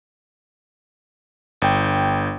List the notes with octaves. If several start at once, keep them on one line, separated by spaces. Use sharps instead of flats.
G1 G5